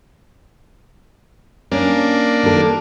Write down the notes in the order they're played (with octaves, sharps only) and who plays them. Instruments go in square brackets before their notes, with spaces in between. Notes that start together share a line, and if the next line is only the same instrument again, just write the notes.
[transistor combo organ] A#3 D4 [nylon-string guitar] C#4
[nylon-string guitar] D#3 A4